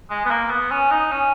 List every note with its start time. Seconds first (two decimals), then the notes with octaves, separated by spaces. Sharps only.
0.10 G#3
0.25 B3
0.30 A#3
0.50 B3
0.71 C#4
0.91 D#4
1.11 C#4